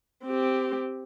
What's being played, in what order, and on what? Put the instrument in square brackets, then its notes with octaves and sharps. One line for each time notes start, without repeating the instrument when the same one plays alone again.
[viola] C4 G4